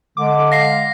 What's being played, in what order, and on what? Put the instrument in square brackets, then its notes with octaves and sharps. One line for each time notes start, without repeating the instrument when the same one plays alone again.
[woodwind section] D3 G#3 [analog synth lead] D6
[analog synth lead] F5 [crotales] A#6 C7